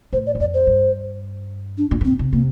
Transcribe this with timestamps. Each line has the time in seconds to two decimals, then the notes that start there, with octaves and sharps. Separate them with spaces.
0.13 A2 C5
0.27 D5
0.35 E2
0.40 F2 D5
0.54 C5
0.67 G2
1.78 D4
1.91 A#2
2.01 A2
2.04 A#2 C4
2.19 C3
2.33 C3 A#3